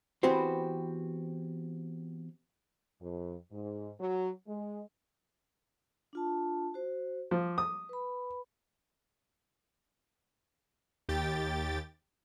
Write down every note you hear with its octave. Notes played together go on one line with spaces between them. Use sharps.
E3 B3 C4 F#4 G4 C5
F2
G#2
F#3
G#3
D4 F4 A5
F#4 C5
F3 D6
D#6
B4 B5
D#2 G4 G5 A6